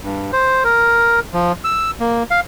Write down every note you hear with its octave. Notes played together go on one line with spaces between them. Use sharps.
G2
C5
A#4
F3
E6
A#3
F5